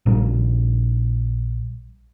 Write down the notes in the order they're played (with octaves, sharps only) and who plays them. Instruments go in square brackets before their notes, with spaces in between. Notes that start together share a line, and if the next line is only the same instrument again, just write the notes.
[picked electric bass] A#1 A#2 G3